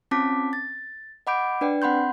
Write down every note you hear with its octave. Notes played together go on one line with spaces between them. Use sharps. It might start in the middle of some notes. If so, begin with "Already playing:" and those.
C4 C#4 F4 A5 D6 B6
A6
D#5 F#5 B5 D6 G6 D7
D4 B4 D5 G5
C4 F#5 B5 C6 G6